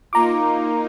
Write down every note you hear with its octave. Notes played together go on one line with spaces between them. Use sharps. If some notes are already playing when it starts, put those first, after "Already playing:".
A#3 D#4 F4 A#5 D6